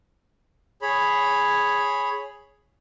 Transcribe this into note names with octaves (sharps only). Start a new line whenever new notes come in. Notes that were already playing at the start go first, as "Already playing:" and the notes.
G#4 C#5 B5